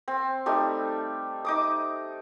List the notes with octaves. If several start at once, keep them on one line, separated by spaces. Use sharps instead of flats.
C4
G3 A3 D#4
D#4 D6 D#6